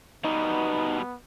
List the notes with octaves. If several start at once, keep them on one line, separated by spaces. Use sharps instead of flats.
B2 G3 B3 D#4